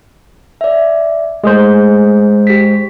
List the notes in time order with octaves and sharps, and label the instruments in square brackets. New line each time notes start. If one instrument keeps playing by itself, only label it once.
[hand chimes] D5 E5
[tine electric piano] G#3 G#4 C5 [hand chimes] A3
[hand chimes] G4 B6